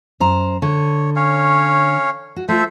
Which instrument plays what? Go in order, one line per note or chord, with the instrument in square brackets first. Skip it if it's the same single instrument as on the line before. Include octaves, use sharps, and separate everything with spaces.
[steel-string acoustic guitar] F#2 C5 A#5
[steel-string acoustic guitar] D3 [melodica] C#5
[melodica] C#4 C#5 F5
[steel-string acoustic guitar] F#4
[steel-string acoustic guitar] A3 F4 [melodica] A4 C5 E5